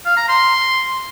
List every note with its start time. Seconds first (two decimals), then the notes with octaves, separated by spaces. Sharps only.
0.06 F5
0.17 A#5
0.29 C6